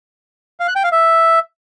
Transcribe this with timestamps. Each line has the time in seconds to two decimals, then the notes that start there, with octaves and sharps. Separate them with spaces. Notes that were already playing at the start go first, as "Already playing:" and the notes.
0.60 F5
0.68 F#6
0.76 G5
0.84 F5
0.92 E5